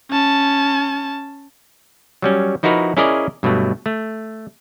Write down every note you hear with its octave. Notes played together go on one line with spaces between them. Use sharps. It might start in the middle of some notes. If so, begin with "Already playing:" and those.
C#4 A5
F#3 G3 C#4
F3 D#4 E4 F#4 A#4 B4
C#4 E4 G#4 A#4 D5 D#5
G2 B2 F#3 A3
A3